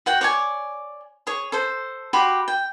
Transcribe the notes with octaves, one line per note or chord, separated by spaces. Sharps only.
F#4 F#5 G5
C#5 D5 G#5
G#4 C#5
A4 C5
F#4 G4 B5 C6
G5